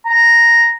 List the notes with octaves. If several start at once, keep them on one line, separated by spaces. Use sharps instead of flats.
A#5